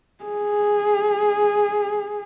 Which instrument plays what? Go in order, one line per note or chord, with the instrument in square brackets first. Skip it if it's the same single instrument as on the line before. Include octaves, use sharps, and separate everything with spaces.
[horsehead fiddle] G#4